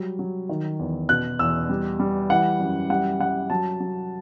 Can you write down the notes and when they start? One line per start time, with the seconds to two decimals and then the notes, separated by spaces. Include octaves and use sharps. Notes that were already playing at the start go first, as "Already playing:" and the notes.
Already playing: F#3 G3
0.19 F#3
0.49 D#3
0.79 E2
1.09 B2 F#6
1.39 E2 E6
1.69 G3
2.00 G3
2.30 E3 F#5
2.60 F#2
2.90 G3 F#5
3.20 G3 F#5
3.50 F#3 A5
3.80 F#3